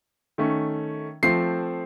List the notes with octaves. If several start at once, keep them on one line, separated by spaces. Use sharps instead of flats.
D#3 A3 C#4
F3 A3 C4 C7